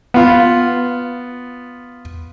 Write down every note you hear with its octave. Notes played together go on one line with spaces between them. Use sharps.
B3 F4